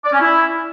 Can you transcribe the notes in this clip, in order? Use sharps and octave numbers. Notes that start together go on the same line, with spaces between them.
D5
C#4
E4